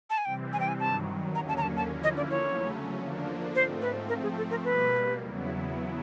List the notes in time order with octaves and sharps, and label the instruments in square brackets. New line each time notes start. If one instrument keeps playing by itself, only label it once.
[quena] A5
G#5
[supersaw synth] C3 E3 G3 C4 [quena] G5
[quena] G#5
G5
G#5
[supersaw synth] G2 D#3 F#3 [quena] A5
[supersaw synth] D#2 D3 F#3 A#3 C#4 [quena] A#5
[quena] A5
A#5
A5
A5
[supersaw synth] D3 F3 A#3 C#4 E4
[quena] D#5
D5
C#5
[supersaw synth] E2 C#3 F#3 A3 C#4
D3 F3 A#3 D4
[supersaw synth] G#2 F3 A3 C4 [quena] C5
[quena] B4
[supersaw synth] F3 A3 C4 [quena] A#4
[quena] G#4
A4
A#4
[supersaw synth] B2 G3 A#3 [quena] B4
[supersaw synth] E2 C#3 F#3 B3 E4